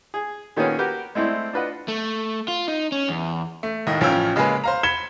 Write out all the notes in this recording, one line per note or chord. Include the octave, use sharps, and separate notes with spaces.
G#4
A#2 D#3 A#3 B3 C#4 G#4
F#4 G4 A#4 B4
G#3 A3 C4 E4 D5
D4 F4 B4 D#5 F#5
A3
F4
D#4
C#4
E2
A3
D#2 A2 D#5
A1 F3 C#4 F5 G5 E6
C#3 G#3 A#3 G#4 B4
C5 F5 A#5
B5 G#6 C#7 E7 G7